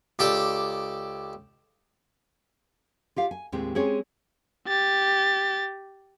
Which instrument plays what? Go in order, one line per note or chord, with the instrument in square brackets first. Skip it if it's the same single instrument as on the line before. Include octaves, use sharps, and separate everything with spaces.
[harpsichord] C#2 G4 A4 D5 G5
[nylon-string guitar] F4 G4 F5
G#5
D#2 A2 G#3 C4 G4
G#3 C4 C#4 G4 G#4 C#5
[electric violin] G4 A6